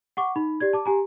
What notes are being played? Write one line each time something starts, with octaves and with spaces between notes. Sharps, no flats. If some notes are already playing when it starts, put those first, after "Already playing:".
F#5 C#6 D6
D#4 B5
G4 D5 G#6
A5 D6
G4 G#5 A#5